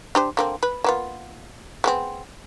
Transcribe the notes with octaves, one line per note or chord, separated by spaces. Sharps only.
D4 G4 C5
D3 A#3 C4
B4
A#3 B3 F4
G#3 B3 C4